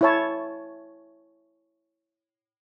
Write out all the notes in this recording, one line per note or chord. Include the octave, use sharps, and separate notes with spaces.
E4 C#5 A5